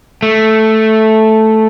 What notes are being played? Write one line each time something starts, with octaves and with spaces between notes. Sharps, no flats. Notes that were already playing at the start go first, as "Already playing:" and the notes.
A3